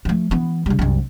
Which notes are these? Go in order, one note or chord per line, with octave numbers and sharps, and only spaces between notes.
F3 A3
E3 B3
C#3 G3
C2 F#2